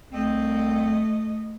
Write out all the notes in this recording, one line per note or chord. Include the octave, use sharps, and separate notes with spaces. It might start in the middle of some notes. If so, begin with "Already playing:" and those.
C2 A3 C4 D#5